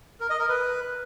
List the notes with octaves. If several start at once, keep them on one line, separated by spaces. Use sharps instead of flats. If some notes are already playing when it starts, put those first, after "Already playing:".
A#4
D#5
A#4
B4